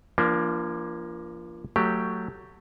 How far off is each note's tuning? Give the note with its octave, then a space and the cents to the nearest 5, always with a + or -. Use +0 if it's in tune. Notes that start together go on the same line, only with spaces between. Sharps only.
F3 -25 A#3 +15 D4 +0
F#3 +0 A3 +20 G4 +0